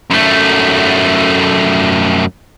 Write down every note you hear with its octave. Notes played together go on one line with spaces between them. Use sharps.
F#2 A3